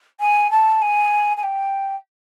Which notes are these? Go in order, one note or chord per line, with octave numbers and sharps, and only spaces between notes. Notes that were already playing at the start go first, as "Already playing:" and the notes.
G#5
A5
G#5
G#5
G5